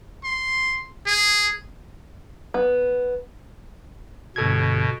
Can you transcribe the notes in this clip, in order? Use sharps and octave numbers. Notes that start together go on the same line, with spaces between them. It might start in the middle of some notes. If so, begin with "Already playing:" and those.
C6
G#4
B3
G1 B2 A4 G#6